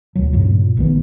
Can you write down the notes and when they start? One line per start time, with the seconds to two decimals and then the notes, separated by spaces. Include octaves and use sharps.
0.15 D2 A#2 F#3
0.33 G2 A#2 C#3
0.77 A#1 D#3 G#3 B3